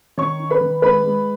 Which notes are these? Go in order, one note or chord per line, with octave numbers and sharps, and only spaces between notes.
D#3 C#5 C#6
D#4
B4 B5
D#3
G#3 B4 B5
G#3